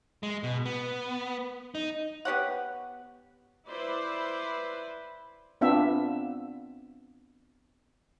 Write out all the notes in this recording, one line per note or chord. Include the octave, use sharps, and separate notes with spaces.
G#3
B2
B3
D#4
B3 G4 C#5 F#5
E4 B4 C5 D5
B3 C4 D4 F4 E5 F5